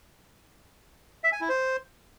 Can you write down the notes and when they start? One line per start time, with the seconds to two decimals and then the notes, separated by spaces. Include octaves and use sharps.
1.24 E5
1.32 G#5
1.41 E4
1.49 C5